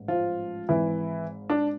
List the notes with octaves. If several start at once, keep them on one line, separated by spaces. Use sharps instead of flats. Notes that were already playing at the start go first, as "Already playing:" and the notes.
Already playing: A1 G#2
F3 F4
G#1 G#2 E3 E4
D4